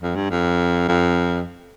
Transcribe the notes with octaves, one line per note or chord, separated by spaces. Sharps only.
F2
G2
F2
F2